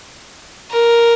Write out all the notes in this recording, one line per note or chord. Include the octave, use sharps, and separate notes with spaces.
A#4